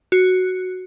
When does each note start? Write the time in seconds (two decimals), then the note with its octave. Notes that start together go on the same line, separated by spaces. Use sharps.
0.12 F#4